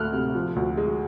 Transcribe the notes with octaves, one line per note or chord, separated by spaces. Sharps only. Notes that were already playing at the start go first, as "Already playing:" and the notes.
Already playing: D2 A3 F6 F#6
C3
F3
D2
G#3